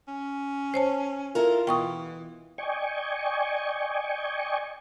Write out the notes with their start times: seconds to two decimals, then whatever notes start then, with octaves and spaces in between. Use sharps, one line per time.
0.08 C#4
0.74 C5 C#5 A5
1.35 E4 F4 A4 A#4
1.67 B2 E3 G5 C#6 D#6
2.58 D5 D#5 G5 G#5 C#6